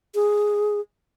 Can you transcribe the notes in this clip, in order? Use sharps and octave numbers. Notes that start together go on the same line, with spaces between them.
G#4